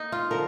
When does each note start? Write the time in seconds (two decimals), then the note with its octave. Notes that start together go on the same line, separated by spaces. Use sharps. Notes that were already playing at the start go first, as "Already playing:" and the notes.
Already playing: A#3 D#4
0.12 F4
0.31 D3 F3 A#4